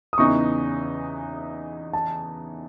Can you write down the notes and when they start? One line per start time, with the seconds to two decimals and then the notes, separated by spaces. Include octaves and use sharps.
0.13 D#6
0.18 E2 C#3 E3 B3 D#4 C#6
1.93 A5